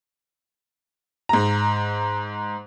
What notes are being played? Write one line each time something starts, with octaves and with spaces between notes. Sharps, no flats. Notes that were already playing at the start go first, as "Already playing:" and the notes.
G#2 A#5